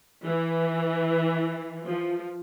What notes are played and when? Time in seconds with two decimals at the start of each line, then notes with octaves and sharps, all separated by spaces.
0.25 E3
1.86 F3